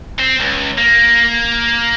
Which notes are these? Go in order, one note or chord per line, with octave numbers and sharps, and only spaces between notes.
C4
C#2
A#3